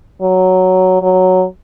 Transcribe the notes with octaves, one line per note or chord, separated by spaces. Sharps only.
F#3
F#3